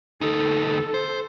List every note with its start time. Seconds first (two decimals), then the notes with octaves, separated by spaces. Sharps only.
0.21 D2 D#4 A4
0.94 C5